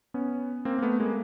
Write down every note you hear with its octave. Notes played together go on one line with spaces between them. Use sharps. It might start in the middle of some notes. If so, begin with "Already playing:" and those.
B3 C#4
A#3 C4
A#3
A3 B3
G#3 A#3